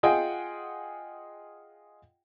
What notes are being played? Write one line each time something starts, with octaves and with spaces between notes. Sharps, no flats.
F4 G#4 D#5 F#5 G5